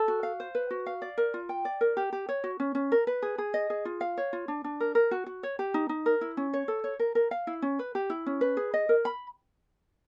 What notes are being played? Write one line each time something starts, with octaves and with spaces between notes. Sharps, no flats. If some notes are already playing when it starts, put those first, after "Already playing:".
Already playing: A4
F#4
F5
C5
B4
F#4
F5
D5
A#4
F4
G5
D5
A#4
G4
G4
C#5
F#4
C#4
C#4
A#4
B4
G#4
G#4
D#5
G#4
F4
F5
C#5
F4
D4
D4
A#4
A#4
F#4
F#4
C#5
G4
D#4
D#4
A#4
E4
C#4
C#5
A4
C#5
A#4
A#4
F5
E4
C#4
B4
G4
E4
C#4
B4
G#4
D#5
A#4
B5